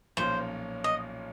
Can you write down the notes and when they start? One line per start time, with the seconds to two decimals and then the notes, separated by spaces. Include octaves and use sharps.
0.17 B1 A#2 F3 A#3 C#4 C5
0.84 D#5